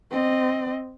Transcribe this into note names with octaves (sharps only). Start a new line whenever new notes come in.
C4 D#5